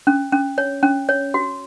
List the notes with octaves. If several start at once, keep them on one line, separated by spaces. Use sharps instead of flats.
C#4
C#4
C#5
C#4
C#5
F#4